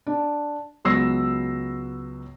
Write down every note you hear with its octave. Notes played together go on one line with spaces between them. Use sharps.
D4
C#2 F#3 B3 E6 A#6 C7